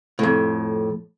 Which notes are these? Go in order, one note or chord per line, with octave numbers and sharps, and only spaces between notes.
F2 A2